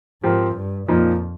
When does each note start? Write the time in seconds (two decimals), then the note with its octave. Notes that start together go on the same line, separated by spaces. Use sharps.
0.22 G#2 F3 C4 G4 A#4
0.55 G2
0.88 F2 A#2 F3 A#3 D#4